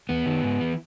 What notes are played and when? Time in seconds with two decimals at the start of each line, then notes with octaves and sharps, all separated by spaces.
0.09 E2 B3
0.26 D#3
0.44 G#2
0.61 E3